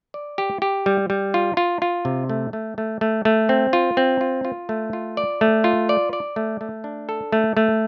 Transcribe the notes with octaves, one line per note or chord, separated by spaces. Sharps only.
D5
G4
G4
G3
G3
F4
F4
F4
C3
A3
A3
A3
A3
A3
C4
F4
C4
F4
F4
A3
F4
D5
A3
F4
D5
D5
A3
A3
D4
A4
A3
A3